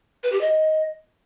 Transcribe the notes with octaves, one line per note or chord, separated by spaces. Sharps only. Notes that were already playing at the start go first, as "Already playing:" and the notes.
B4
G4
D#5